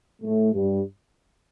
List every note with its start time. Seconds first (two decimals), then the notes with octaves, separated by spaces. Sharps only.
0.22 A2 A3
0.53 G2 G3